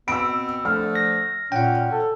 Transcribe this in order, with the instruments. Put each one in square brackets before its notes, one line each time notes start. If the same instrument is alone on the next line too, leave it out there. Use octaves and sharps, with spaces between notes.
[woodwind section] B2 B3 C4 [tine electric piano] B5 [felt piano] E6 D7
[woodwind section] D3 F3 A3 [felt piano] F6
[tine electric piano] A#6
[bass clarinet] A#2 [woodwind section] C#4 [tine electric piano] F#5 G5
[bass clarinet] A4